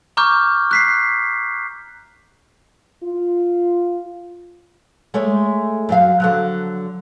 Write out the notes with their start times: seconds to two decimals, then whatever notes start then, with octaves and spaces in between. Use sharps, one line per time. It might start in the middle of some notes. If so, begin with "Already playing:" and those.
0.17 A#5 C#6 D6 F6 G6
0.71 F#6 B6 C7
3.03 F4
5.14 G#3 A3 C#5
5.89 F#2 F#3 F5
6.20 D3 F3 F#3